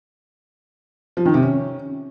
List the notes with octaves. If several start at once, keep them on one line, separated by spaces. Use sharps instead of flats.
F3
D#3
C3
C#4